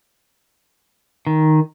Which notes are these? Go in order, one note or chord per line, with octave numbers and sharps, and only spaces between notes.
D#3